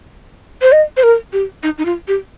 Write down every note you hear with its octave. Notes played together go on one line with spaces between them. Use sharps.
C5
D#5
C5
A#4
G4
D#4
D#4
F4
G4